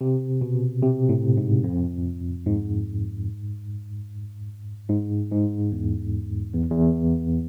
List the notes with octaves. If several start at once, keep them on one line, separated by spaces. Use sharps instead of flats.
C3
B2
C3
A2
G#2
F2
G#2
G#2
G#2
E2
E2
E2